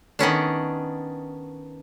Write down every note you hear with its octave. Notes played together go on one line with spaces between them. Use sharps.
D#3 B3 C#4 D4